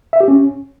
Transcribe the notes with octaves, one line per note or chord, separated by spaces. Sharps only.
E5
G4
C#4